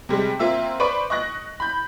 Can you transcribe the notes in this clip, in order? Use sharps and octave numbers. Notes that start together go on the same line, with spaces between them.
C3 G3 G#3
A#3 C4 F4 E5 E6
B4 C5 D5 B5 C#6 D7
D#5 C#6 F#6 A#6
B5 G6